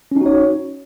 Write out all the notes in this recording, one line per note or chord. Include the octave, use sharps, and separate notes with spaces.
C#4 D#4 F#4 C#5